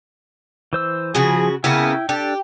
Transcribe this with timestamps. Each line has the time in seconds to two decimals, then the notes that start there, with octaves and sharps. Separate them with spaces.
0.73 E3 C5 E6
1.15 C#3 F3 F#4 G#4
1.64 C#3 A#3 B3 E4 G5
2.09 D4 G4 A4